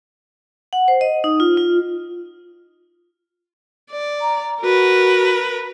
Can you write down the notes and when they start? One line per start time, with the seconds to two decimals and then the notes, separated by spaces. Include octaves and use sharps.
0.73 F#5
0.88 C5
1.01 D#5
1.24 D#4
1.40 F4
1.57 F4
3.91 D5
4.21 A#5
4.62 F#4 A#4 B4